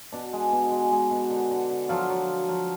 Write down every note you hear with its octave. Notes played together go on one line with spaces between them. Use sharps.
B2 D4
G#3
B2
G#3
G#3
B2
D3
D3
D3
F3 F#3 F4
F#3
F#3
F3 F#3 F4